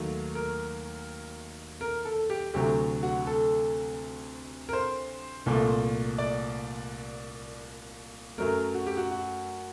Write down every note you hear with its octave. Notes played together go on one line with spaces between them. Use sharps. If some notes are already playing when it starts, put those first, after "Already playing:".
Already playing: D#2 D#3 F#3 A3
A#4
A#4
A4
G4
D2 C3 F#3 A3 G4
F#4
A4
A#4
C5
C2 A#2 A3
D5
F#2 F#3 A3 A#4
F#4
G4
F#4
F#4